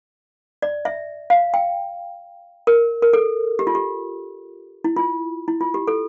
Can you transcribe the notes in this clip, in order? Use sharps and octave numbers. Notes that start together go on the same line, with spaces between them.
D5
E5
F5
G5
A#4
A#4
A4
G4
F4
G4
E4
F4
E4
F4
G4
A4